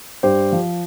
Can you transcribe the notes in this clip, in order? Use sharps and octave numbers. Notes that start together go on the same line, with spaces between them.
G2 G4 C5
F3